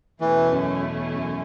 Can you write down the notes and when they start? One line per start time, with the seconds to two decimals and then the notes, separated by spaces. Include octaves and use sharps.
0.21 E2 B2 E3 A3 C#4 E4
0.52 F#2
1.14 F#2